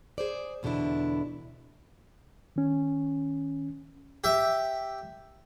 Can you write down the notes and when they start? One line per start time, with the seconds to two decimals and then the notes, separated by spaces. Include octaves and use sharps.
0.18 G#4 C5 D5
0.63 E2 B2 D3 D4 E4
2.56 D#3 C#4
4.24 G4 E5